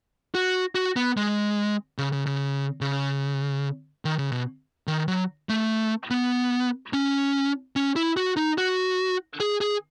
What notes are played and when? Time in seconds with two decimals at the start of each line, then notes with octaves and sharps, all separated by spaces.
0.35 F#4
0.75 F#4
0.96 B3
1.17 G#3
1.98 C#3
2.13 C#3
2.26 C#3
2.81 C#3
4.05 D#3
4.19 C#3
4.32 B2
4.87 D#3
5.08 F#3
5.49 A3
6.11 B3
6.93 C#4
7.76 C#4
7.96 E4
8.17 F#4
8.37 D#4
8.58 F#4
9.40 G#4
9.61 G#4